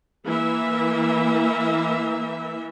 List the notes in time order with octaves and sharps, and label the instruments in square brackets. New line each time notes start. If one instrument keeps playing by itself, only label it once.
[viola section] E3 A#3 E5